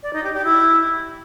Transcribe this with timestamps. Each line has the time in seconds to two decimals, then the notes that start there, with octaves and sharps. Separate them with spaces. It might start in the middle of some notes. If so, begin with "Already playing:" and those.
0.03 D5
0.13 D#4
0.24 G4
0.34 G4
0.45 E4